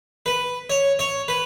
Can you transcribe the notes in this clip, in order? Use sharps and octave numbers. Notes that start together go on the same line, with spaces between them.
B4
C#5
C#5
B4